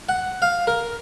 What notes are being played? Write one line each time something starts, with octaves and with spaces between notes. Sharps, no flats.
F#5
F5
A#4